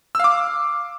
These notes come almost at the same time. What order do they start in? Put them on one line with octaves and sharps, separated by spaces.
E6 F5 D6